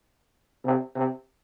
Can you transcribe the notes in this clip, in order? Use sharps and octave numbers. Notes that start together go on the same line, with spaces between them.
C3
C3